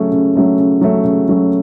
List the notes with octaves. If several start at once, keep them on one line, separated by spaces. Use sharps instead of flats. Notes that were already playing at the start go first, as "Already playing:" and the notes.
Already playing: C#3 F#3 A3 C#4
C#3
F#3 A3 C#4
C#3
F#3 A3 C#4
C#3
F#3 A3 C#4